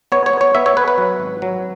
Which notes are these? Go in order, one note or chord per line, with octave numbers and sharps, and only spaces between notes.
B3 C#5
C#5
B3
C#5
B3 E5
C#5
B3 B4
B4
F#3
G#1
F#3